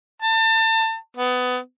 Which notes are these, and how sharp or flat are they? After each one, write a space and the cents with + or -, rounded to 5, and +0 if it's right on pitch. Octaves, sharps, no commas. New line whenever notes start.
A5 +30
B3 +20